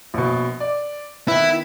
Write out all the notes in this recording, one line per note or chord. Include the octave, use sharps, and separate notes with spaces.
A#1 B2
D5
D#3 B3 E4 B4